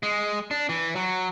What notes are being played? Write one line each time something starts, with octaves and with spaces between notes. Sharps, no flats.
G#3
D4
E3
F#3